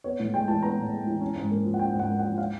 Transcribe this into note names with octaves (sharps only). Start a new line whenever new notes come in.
B3 C#5
A2
G#3 G5
E3 A5
B3 A#5
A2
G#3
E3
C#4
G#2
A#3
F3
F#5
C#4 G5
G#2 F#5
A#3
F#5
F3
F5